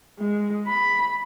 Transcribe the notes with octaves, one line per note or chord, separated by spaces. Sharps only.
G#3
B5